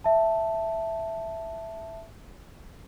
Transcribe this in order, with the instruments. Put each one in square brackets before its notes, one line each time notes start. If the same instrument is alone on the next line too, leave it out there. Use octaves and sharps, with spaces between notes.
[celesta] E5 A5